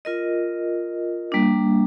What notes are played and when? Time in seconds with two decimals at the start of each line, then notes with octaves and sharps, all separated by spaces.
0.05 F4 A#4 D#5
1.32 G3 A#3 D4